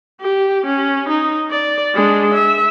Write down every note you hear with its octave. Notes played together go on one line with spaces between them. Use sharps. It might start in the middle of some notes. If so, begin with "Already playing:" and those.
G4
C#4
D#4
D5
G#3 D4
E5